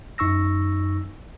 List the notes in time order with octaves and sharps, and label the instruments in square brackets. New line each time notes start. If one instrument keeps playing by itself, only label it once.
[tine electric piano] F#2 D#4 C#6 E6 A#6